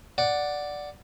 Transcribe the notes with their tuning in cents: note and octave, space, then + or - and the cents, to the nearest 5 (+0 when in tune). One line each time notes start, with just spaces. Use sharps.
D5 +0 F#5 +0